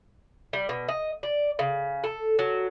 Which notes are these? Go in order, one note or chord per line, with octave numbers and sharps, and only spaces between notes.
G3
B2
D#5
D5
C#3
A4
F#3